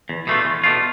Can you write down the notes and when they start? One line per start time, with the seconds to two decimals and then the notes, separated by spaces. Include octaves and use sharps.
0.09 E2
0.27 B2 A3 D4 F4
0.45 E2
0.64 B2 A3 D4 F4